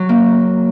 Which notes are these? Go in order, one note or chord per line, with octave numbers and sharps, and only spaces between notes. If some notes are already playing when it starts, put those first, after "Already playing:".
Already playing: F#3
A#3